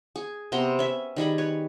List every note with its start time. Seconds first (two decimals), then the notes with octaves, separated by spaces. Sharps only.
0.16 G#4
0.52 C3 B3 A#5 C6
0.79 C#4 E5
1.16 D#3 G3 G#4 B5
1.38 B4 C#5